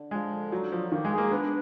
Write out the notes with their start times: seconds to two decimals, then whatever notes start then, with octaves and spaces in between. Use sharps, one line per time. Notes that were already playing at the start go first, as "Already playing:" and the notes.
Already playing: D3
0.11 F3 G#3
0.32 D3
0.51 F#3 D#4
0.72 F3 F#3
0.92 D#3 A#3
1.05 G#3
1.12 G#4
1.18 A#3
1.31 B3 D4